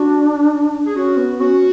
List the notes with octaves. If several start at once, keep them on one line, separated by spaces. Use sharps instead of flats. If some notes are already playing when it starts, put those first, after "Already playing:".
Already playing: D4 F#4
G#4
C#4 F#4
B3
C#4 F#4